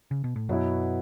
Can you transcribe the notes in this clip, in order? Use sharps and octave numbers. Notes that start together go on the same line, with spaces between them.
C#3
B2
A2
F#2 B2 F#3 B3 E4